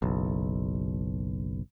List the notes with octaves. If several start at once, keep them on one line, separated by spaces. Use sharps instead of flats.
F#1 B1